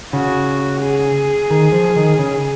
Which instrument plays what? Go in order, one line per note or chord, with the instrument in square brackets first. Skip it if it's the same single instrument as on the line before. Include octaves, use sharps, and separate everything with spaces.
[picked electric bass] C#3 [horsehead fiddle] F#4
[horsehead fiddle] G#4
[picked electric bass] D#3
F3
D#3
C#3